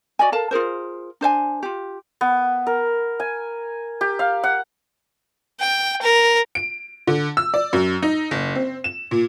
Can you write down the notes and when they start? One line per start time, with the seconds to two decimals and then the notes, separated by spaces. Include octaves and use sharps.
0.19 F#4 D5 D#5 G#5
0.32 A4 A#4 F5 A5
0.51 F4 G#4 A#4 C5
1.21 D4 C5 E5 G#5
1.63 F4 G4
2.21 B3
2.67 A#4
3.20 G#5
4.01 G4
4.19 F5
4.44 F#5
5.60 G5
6.02 A#4
6.55 D7
7.07 D3
7.37 E6
7.54 D5
7.73 F#2
8.02 D#4
8.31 F#1
8.55 C4
8.84 E7
9.11 A#2